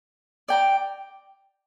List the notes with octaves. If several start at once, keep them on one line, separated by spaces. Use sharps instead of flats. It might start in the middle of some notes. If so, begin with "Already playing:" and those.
D5 G5 A#5